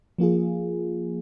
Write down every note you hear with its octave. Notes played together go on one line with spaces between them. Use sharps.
F3 A#3 F4 G#4